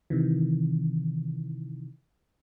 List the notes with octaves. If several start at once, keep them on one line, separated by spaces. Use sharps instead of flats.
C3 D#3 E3